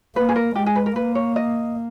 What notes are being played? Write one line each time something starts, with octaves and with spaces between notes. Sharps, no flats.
A#3 B4
G#4
A#4
G#3 G4
G#4
B4
A#4
A#3 B4
C#5
D#5